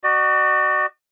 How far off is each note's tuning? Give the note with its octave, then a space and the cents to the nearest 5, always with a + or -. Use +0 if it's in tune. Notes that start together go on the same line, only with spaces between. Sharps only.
F#4 +25 D5 +45